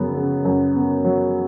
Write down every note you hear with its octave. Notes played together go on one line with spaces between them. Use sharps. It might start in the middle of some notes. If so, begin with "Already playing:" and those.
Already playing: F#2 C#3 F#3 B3
C#3
F#2
B3
F#3